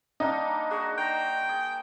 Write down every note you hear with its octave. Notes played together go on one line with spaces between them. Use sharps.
G3 A#3 D4 D#4
F#4 G#4
C5 G5 A#5 C#6
G#4